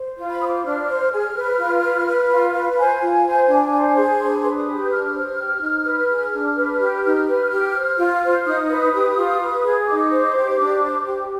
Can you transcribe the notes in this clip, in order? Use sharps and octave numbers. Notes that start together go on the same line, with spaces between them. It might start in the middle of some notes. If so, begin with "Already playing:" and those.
Already playing: C5
F4
B5
C5 D#6
D6
D4 F6
C5
G#4
B4
F4
B4
B4
F4
B4
C5 G#5
F4
C5
D4
C5
G#4
D4 C6
B5
B4 C6
D#6
G4
G6
D4 F6
C5
G4
D#4
B4
G#4
D4
B4
G4
D#4 F6
B4
G4
C5
F4
C5
D#4 D#6
B4
G4
F4
B4
G#4
D#4 D6
C5
G4
D4
C5
G4